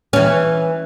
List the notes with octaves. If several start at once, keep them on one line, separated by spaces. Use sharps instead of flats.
E3 C#4